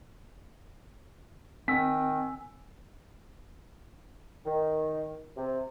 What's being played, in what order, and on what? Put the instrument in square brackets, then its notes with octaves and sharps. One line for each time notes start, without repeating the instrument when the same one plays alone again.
[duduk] D#3 [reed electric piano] C4 [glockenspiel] G#5 E6 [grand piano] B6
[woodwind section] D#3
C3